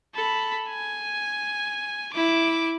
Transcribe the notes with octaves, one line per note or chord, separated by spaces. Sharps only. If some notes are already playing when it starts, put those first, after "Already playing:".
A4 B5
G#5
E4 D6